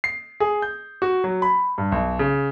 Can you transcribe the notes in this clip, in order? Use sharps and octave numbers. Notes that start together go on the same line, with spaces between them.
C7
G#4
G6
F#4
F#3
B5
G2
B1
C#3